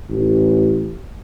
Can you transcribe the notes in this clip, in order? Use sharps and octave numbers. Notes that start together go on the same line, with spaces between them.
A1